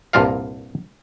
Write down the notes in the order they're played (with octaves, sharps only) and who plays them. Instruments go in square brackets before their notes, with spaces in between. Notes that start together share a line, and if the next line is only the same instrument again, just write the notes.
[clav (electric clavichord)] C2 G2 A#2 F4 A#4 F5